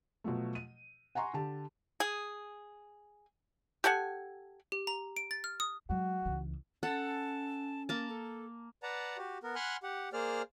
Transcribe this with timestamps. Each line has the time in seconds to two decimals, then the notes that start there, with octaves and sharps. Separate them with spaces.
0.24 B2 F3 F#3 A3
0.55 D#7
1.15 F#5 G#5 A#5 C6 C#6
1.34 D3 G4 A5
2.00 G#4
3.84 G4 A4 F#5 G#5
4.72 G4
4.87 A#5
5.17 D7
5.31 A6
5.44 F6
5.60 D#6
5.90 F#3 G#3 F#4
6.26 C#2 E3
6.83 C#4 A4 F#5 A5
7.89 A#3 A5
8.09 A4
8.83 B4 D5 F#5 A5 A#5
9.18 F#4 G4
9.43 B3 A#4
9.55 F#5 G#5 B5 C6 F6 F#6
9.83 G4 F#5
10.13 A#3 G#4 C5 D5 F6